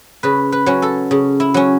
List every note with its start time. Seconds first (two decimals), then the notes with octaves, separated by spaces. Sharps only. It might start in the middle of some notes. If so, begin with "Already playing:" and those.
0.23 C#3 B4
0.52 B4
0.66 F#3 C#4
0.82 A4
1.11 C#3
1.40 E4
1.54 F#3 C#4